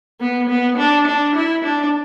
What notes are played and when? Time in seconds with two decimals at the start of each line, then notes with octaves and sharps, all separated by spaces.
0.20 B3
0.49 B3
0.77 D4
1.07 D4
1.35 E4
1.64 D4